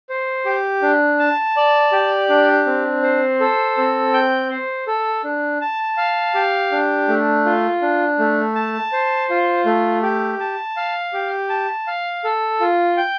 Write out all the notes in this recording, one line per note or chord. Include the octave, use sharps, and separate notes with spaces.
C5
G4
D4
A5
D5
G4
D4
C4
C5
A4
C4
G5
C5
A4
D4
A5
F5
G4
D4
A3
F4
D4
A3
A5
C5
F4
A3
G4
A5
F5
G4
A5
F5
A4
F4
G5